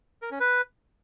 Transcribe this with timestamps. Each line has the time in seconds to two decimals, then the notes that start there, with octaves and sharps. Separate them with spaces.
0.22 A#4
0.31 C#4
0.40 B4